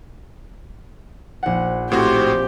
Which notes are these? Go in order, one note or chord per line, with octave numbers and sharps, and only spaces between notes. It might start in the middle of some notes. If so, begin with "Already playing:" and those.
A#1 F#5
A2 C4 F#4 G4